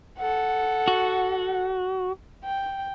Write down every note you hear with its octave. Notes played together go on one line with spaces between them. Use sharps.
A4 F#5
F#4
G5